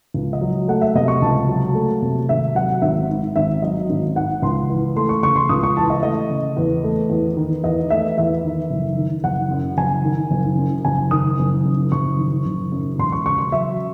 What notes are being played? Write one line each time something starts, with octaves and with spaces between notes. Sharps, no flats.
C#2
D#5
F#3
A3 F#5
E5
C3 D#5
C#6
C#2 A5
F#3
A3
C3
G#1 E5
F#3 F#5
G#1 E5
G#2
G#1 E5
F#3 D#5
G#1
G#2 F#5
C#2 C6
E3
A3 C6
C#6
C#3 C#6
C6
C#2 D#6
C#6
E3 A5
D#5
A3 D#5
C#3
E2
A3
E2
D#3
E2 D#5
A3 E5
E2 E5
D#3
F#1
D#3
F#1 F#5
F#2
F#1 G#5
D#3
F#1
F#2
F#1 G#5
D#3 D#6
F#1
F#2
F#1 C#6
D#3
F#1
F#2
E1 C6
C#6
C#3 C#6
C6
F#3 E5